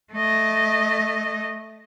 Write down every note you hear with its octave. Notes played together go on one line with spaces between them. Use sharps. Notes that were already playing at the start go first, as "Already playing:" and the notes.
A3 D#5